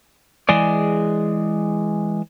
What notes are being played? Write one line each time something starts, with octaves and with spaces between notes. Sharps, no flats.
E3 G#3 G#4 D5